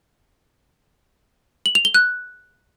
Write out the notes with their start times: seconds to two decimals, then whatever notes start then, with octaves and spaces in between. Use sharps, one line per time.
1.66 F#7
1.75 F7
1.85 G7
1.94 F#6